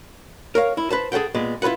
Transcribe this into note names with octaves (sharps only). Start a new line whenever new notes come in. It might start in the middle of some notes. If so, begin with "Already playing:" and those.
A#4 C#5 F5
E4
B4 C5 A5
G#4 A4 C5 F#5 G5
A#2 G#3 B3
E4 F4 A4 B4 F#5